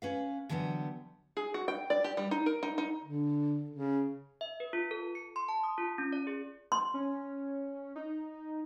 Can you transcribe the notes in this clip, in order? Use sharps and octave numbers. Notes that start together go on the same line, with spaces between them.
C#4 B4 F5
D3 E3 F#3 G3 B3
G#4
F#4
G5
D5
G4
G3
D#4
A#4
D#4
D#4
D3
C#3
E5
B4
F4
A4
C#7
C6
A5
D#6
F4
C#4
D5
G#4
C6
C#4
D#4